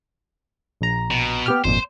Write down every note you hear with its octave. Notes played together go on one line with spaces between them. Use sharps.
A#1 A#5
B2
B3 G4 F6
G#1 F2 A#2 C5